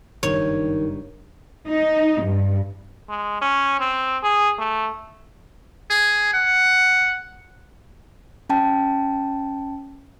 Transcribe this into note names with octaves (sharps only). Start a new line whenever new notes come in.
F#1 G2 D#3 C#5
D#4
G2
G#3
C#4
C4
G#4
A3
G#4
F#5
C#4 G5 A5